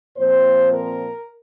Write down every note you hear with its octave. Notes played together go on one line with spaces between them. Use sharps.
A#2 F3 C4 C5
A#4